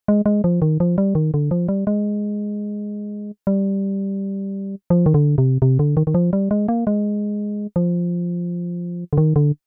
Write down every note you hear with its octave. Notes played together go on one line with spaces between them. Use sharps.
G#3
G#3
F3
D#3
F3
G3
D#3
D3
F3
G3
G#3
G3
F3
D#3
D3
C3
C3
D3
D#3
D#3
F3
G3
G#3
A#3
G#3
F3
D3
D#3
D3